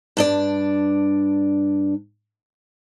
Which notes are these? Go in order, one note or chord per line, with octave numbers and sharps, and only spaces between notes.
G2 D4 D5